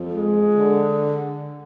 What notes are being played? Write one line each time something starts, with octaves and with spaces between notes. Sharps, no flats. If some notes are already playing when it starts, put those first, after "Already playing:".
Already playing: F2
G#3
D3